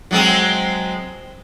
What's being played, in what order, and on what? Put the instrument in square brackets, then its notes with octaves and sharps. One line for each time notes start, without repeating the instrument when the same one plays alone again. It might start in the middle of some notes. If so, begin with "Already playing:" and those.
[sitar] F#3 G#3 C4